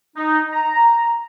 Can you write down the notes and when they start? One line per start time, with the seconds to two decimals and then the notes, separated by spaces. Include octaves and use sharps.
0.15 D#4
0.52 A#5